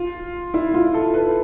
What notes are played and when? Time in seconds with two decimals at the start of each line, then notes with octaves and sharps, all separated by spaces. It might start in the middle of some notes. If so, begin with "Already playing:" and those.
Already playing: F4
0.54 E4
0.74 F4
0.94 A4
1.14 B4